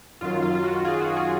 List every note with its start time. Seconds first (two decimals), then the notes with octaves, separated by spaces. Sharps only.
0.21 F#2 D#3 F#3 F4
0.42 F4
0.55 F4
0.64 F#4
0.85 F4 G#4
1.00 F#4
1.16 F4 G#4